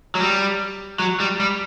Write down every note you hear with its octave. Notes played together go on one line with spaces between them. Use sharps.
F#3
G3
F#3
G3
G3